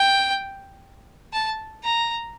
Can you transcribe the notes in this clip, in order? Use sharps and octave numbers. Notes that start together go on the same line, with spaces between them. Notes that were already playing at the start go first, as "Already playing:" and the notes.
Already playing: G5
A5
A#5